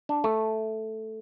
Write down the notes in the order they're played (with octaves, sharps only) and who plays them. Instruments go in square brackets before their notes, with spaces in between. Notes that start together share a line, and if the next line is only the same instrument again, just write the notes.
[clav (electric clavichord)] D4
A3